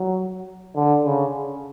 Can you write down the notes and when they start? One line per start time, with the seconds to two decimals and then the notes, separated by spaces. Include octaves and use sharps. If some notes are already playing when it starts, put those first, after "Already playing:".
Already playing: F#3
0.75 D3
1.05 C#3